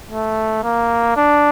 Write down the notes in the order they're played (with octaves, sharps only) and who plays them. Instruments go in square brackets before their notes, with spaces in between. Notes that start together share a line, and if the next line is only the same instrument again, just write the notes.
[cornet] A3
A#3
D4